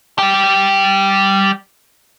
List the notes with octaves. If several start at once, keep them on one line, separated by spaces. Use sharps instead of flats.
G3 G4